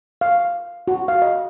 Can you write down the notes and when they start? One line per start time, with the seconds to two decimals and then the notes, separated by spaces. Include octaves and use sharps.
0.21 F5
0.88 F#4
1.08 F5
1.22 D#5